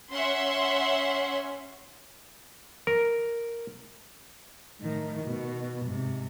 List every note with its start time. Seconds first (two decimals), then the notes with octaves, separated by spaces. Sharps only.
0.12 C#4 E5 F#5 C6
2.87 A#4
4.81 A2 D#3
5.23 B2
5.85 G#2 C3